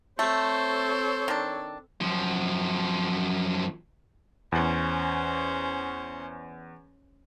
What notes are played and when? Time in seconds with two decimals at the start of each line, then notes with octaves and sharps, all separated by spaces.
0.19 A3 C4 A4 C5 C#5
1.28 D#3 D4
2.01 F#2 F3
4.52 E2 C#4 C5